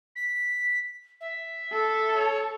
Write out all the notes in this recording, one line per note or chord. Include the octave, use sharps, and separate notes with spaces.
B6
E5
A4
C#5